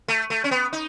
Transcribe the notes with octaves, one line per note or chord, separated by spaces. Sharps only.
A3
A3
C#4
B3
D#4